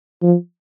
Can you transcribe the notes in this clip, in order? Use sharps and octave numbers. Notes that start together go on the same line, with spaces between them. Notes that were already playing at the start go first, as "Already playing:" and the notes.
F3